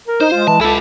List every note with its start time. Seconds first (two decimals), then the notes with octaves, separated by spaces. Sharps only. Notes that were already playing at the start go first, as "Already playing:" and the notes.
0.08 A#4
0.21 D#4 C5
0.32 G#3 F4
0.47 E3 A5
0.61 C#2 E4 G4 A4